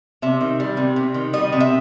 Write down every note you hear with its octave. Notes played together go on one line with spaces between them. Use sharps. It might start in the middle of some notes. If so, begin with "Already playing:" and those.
C3 E5
D#3
G3
C3
C3
D#3
G3 D#5
C3
E5